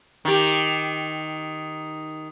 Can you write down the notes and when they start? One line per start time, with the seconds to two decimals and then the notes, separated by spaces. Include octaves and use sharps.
0.25 D#3 G4